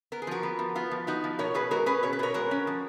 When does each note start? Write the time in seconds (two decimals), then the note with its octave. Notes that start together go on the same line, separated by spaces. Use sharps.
0.12 B3 A#4
0.22 G#4
0.27 F3 F#4 A#4
0.43 B3
0.59 F3
0.75 B3 F4
0.91 F3
1.07 B3 D#4 F#4
1.24 F3
1.39 B2 A#4 C#5
1.54 B2 G#4 B4
1.71 G#3 F#4 A#4
1.86 C#4 G#4 B4
2.03 B2 C#5
2.13 B4
2.19 B2 A#4 C#5
2.34 G#3 F#4 A#4
2.51 C#4
2.67 F3